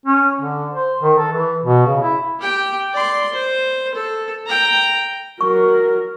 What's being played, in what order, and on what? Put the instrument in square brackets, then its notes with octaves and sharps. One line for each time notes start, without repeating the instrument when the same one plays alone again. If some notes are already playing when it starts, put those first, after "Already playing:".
[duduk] C#4
D3
C5
D#3
A4
E3
B2
C#3
E4
[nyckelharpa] G4 G5
D5 C6
C5
A4
G5 A#5
[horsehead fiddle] F#3 A#4 [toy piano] C#6